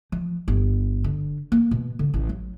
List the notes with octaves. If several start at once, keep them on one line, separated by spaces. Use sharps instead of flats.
F3
G1
D3
A#3
B2
D3
A1
F#3